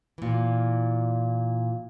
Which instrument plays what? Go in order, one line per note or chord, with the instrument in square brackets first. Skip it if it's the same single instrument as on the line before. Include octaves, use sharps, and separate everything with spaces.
[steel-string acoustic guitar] A#2 E3